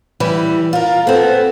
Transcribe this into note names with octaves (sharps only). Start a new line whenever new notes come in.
E3 G3
F4 A#4
B3 C4 A4